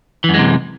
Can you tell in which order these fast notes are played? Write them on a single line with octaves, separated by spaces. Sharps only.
E3 F#2 G#3 C3